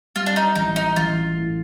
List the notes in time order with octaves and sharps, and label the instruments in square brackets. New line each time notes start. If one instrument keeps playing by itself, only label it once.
[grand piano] G3 [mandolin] F4
[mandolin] D4
D#4
[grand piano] A1 [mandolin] D#4
[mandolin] D#4
[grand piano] A1 [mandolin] F4
[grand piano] A2